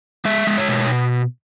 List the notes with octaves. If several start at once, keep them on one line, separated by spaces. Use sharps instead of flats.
G#3 E5
G#3
C#5
B2